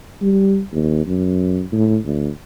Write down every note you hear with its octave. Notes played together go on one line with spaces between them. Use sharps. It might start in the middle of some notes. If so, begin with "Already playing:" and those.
G3
D#2
F#2
A2
D2